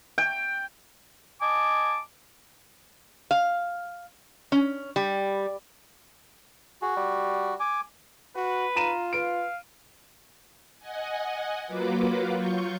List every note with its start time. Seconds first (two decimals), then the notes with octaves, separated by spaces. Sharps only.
0.18 G5
1.41 D#5 G#5 A5 D6
3.31 F5
4.52 C#4
4.96 G3
6.82 F#4 G#4
6.97 G3
7.60 G#5 D6
8.36 F#4 B4
8.76 F4 A#5 D#7 E7
9.13 B4 F5 D7
10.79 D#5 F#5 G#5
11.66 F#3 A#3 F4 F#4 B4 D6
12.31 F#3 F4 C#6 G6